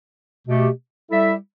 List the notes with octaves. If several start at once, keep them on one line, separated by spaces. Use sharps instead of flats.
B2 A3 G4
G3 E4 A4 E5